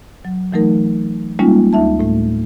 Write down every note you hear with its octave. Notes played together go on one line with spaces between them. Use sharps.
F#3
E3 F#3 A3 D#4 A#4
G3 G#3 A#3 C#4 D#4 F4
D2 D#4 E5 A5
A2 A3